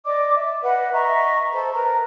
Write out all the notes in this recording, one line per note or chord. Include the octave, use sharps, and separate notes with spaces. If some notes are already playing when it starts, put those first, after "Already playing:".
D5 D#5 D6
E5
B4 D#5 F#5
D#5 E5 A#5 C#6
A4 C5 D#5 B5
A#4 B4 A#5